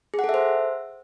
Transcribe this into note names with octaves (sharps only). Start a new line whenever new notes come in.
G#4
F#5
A4
E5
C5